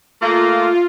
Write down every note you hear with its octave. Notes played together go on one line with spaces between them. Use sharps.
A3 A#3 F4